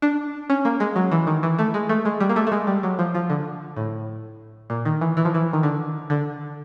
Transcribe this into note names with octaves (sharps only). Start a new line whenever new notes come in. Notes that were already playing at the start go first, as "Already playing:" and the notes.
D4
C#4
A#3
G#3
F#3
E3
D#3
E3
A3
G#3
A3
G#3
G3
A#3
A3
A3
G#3
G3
F#3
F3
F3
D3
A2
A#2
D#3
E3
E3
F3
E3
D#3
D3
D3